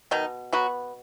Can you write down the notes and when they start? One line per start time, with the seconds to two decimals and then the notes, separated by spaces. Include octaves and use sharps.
0.11 B2 D#3 D#4
0.53 F#3 B3 F#4